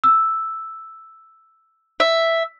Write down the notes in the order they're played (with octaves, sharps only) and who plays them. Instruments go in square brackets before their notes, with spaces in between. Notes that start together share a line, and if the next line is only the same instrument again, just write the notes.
[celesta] E6
[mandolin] E5